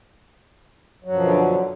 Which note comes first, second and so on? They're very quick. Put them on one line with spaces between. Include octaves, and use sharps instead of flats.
F#3 F#2 F3 B2 D3